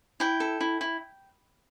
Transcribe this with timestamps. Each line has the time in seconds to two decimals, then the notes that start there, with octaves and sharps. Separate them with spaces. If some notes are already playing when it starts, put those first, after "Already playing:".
0.20 E4 G5
0.40 A4
0.61 E4
0.81 E4